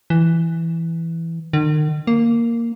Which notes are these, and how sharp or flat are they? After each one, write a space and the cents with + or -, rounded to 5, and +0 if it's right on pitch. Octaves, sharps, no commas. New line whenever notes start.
E3 +5
D#3 -40
A#3 -5